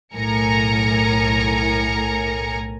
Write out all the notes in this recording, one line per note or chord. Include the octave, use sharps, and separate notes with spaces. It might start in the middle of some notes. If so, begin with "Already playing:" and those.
B1 A2 A#4 G#5 A#5 C#7